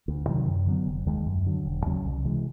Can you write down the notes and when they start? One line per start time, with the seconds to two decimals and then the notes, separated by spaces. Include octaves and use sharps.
0.08 D2
0.27 C3 D#3 F#3
0.47 F#2
0.67 D3 F#3 B3
0.87 F1
1.07 D#2 D#3 G#3
1.26 F#2
1.46 D3 F#3
1.65 E1
1.86 D#2 C#3 F#3
2.05 C2
2.25 C3 E3 G#3